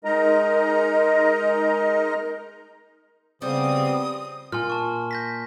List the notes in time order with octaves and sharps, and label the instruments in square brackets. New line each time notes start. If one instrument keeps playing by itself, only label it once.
[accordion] G#3 D#4 A#4 D#5 A#5
[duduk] C#3 [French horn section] F3 B3 C4 [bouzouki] G3 [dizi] D#6
[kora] A#2 [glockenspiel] G#5 C6 F6
[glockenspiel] A5 C#6
G6 A#6 B6